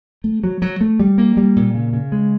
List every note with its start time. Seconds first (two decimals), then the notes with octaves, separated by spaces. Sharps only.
0.24 A3
0.44 F#3
0.62 F#3
0.81 A3
1.00 G3
1.18 A#3
1.37 G3
1.56 A#2
1.74 C#3
1.93 C#3
2.12 G#3